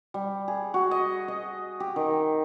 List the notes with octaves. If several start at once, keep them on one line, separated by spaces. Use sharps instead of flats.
G3
G#4
F#4
D#5
D#5
G4
D#3